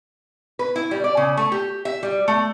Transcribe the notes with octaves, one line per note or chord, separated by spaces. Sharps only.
B4
E4
G3
D5
C#3
A3
G4
E5
G3
A3